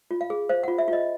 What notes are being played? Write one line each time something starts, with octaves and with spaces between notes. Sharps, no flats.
F4
F5
G#4
C5 F5
F4 F#5
E5
F4 D#5